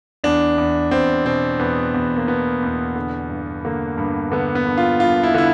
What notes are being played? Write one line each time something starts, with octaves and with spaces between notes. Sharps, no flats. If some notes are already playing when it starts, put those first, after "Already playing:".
E2 D4
E2
E2 C4
B2 C4
E2 B3
E2
A#3
B2 B3
E2
D3
G2
D3 A#3
G2
D3 B3
B3
D3
F4
G2 F4
E4
D3 E4